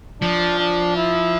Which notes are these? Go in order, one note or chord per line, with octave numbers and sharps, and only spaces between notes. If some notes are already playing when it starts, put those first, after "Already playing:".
F3 D4
D4
E4